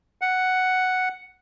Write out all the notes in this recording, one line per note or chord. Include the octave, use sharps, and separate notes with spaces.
F#5